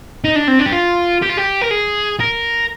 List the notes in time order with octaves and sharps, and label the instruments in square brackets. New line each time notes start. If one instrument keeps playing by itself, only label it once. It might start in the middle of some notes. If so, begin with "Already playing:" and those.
[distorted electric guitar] D#4
D4
C4
D4
G4
F4
G4
F4
G4
A#4
G#4
A#4